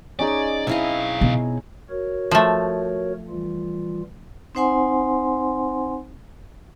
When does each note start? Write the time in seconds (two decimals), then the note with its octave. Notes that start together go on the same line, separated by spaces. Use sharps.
0.19 C#4 D#4 G#4 D5
0.67 B1 C4 E4 D#5 F5
1.21 B2
1.90 F#4 A#4 C#5
2.31 F3 A3
3.29 E3 G3 F4
4.55 C4 D#4 C5 F#5 G#5 C6